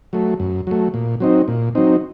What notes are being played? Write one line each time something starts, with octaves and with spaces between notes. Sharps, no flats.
F#3 A3
F#2
F#3 A3
A#2
F#3 C4 D#4
A#2
F#3 C4 D#4